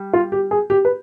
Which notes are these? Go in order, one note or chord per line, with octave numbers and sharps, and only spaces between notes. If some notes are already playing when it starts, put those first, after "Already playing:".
Already playing: G3
F4
G4
G#4
G4
B4